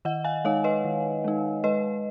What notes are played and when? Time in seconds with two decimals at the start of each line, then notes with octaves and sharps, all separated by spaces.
0.05 D#3 D#5 F#5
0.24 F5 G#5
0.45 G#3 D#4 C#5 F5
0.64 B4 D#5
0.84 D#3
1.24 G#3 D#4
1.64 G#3 B4 D#5